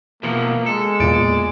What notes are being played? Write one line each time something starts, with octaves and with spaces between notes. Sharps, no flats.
B2 E3 F3 A#3
G#3 A4
E2 A#2 D5